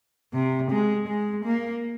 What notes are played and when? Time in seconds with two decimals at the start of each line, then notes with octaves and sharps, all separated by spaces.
0.33 C3
0.71 G#3
1.07 G#3
1.44 A#3